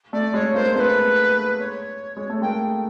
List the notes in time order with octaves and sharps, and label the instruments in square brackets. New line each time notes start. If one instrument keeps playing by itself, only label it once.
[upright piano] A3 [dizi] D5
[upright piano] G#3 [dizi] C#5
[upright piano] G#3 A#3 [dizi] C5
[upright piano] A3 B3 [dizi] B4 C5
[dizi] C#5
[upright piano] G#3
A3
[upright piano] G#3 A#3 [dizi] G5